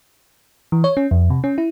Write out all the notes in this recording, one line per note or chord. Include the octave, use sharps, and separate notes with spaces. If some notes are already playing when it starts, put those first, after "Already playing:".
E3
C#5
C#4
F2
C3
C#4
E4